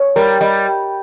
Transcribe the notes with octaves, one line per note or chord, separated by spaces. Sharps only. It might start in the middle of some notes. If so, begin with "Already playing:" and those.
Already playing: C#5
G3 A#4
G3 D#5